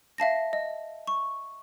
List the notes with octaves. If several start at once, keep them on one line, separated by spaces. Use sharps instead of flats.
E5 F5 A5 A#6
D#5
C#6